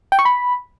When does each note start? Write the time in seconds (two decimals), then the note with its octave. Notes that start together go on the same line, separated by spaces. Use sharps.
0.12 G5
0.19 C#6
0.25 B5